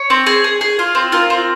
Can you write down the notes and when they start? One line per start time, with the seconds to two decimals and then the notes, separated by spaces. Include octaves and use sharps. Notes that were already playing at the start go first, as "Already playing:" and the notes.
Already playing: C#5
0.10 C4
0.26 G#4
0.44 G#4
0.61 G#4
0.79 F4
0.95 C4
1.12 F4 A#4
1.30 C4